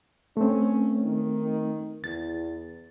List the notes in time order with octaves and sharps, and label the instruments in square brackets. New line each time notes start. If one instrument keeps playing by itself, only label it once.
[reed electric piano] A3 C4 [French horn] C#4
[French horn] D#3
[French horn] E2 [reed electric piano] A6